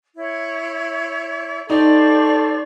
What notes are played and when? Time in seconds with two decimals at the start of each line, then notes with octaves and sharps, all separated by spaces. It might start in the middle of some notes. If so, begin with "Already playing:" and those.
0.16 E4 C#5
1.70 D#4 G4 A4 C5 D5 C#6